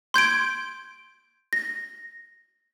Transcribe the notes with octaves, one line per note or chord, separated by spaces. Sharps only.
C6 G6 G#6 D7
A#6